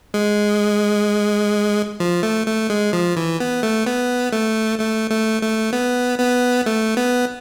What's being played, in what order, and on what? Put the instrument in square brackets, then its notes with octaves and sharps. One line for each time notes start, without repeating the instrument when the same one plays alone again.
[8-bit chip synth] G#3
F3
A3
A3
G#3
F3
E3
B3
A3
B3
A3
A3
A3
A3
B3
B3
A3
B3